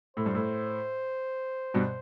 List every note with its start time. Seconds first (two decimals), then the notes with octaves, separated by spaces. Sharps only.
0.17 A2 C5
0.26 G2
0.35 A2
1.74 G2 B2